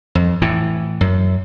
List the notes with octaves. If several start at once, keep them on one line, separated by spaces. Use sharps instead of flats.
F2
A2 E3
F#2